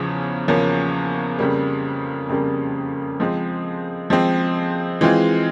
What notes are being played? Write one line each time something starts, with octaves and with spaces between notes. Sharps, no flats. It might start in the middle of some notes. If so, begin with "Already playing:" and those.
Already playing: E2 C#3 F3 C#4
E2 C#3 F3 A#3 C#4
F2 C#3 G3 A#3
F2 C#3 G3 A#3
F3 G#3 C4
F3 G#3 C4
E3 G#3 C4 F4 G#4